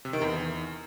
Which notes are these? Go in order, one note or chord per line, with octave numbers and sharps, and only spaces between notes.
C3
D#3
E2